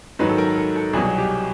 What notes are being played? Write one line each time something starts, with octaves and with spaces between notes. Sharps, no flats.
G#2 D#3 F#3 B4
A4
A#4
A4
A4
C2 B2 F#3 G#4
G4